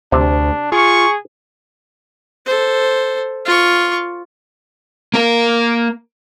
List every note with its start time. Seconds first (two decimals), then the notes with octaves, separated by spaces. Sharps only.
0.12 D2 C3 D4
0.72 F4 G#4 C#6
2.46 A4 C5
3.45 F4 C#6
5.14 A#3 A#4